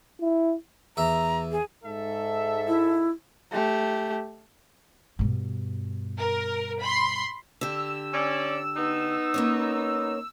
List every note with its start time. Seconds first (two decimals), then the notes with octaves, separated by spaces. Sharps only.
0.21 E4
0.97 E2 E5 A#5
1.51 G#4
1.85 G#2 A4 E5
2.68 E4
3.52 A3 G4
5.19 G2 B2
6.18 A#4
6.82 B5 C6
7.61 D3 G4 E6
8.14 C#4 D5
8.76 B3 D#4
9.34 A#3 C#4 C#5